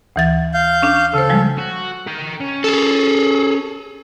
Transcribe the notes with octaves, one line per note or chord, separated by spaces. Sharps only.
D2 E3 A6
F5 G6
C#4 D4
C#3 A4 C5
F3 G3 G#3
F#4
A#4 G5
C#4
G#4 A4